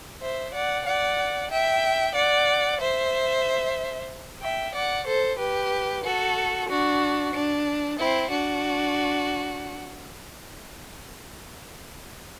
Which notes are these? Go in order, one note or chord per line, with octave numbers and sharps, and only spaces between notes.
C5 E5
D5 F#5
D5 F#5
E5 G5
D5 F#5
C5 E5
E5 G5
D5 F#5
A4 C5
G4 B4
F#4 A4
D4 F#4
D4
C4 E4
D4 F#4